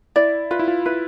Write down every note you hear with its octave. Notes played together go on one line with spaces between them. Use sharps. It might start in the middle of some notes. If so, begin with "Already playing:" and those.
E4 D5
F4 B4
E4
F4
E4 B4